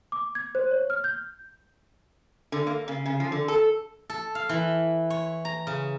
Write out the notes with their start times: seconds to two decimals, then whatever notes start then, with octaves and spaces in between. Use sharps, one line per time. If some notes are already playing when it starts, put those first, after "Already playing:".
0.12 D6
0.35 G#6
0.55 C5
0.71 C#5
0.90 F6
1.04 G6
2.52 D3
2.67 A#3
2.88 C#3
3.06 C#3
3.20 F3
3.32 D3
3.48 A4
4.10 A4
4.35 F5
4.49 E3
5.10 C#5
5.45 A#5
5.67 C#3